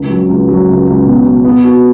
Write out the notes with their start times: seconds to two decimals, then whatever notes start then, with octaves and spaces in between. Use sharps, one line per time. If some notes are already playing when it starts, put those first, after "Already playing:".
Already playing: C#2
0.10 F#3
0.29 C#2
0.48 F#3
0.68 C#2
0.87 C#2
1.06 B2
1.25 B2
1.45 B3
1.63 F#4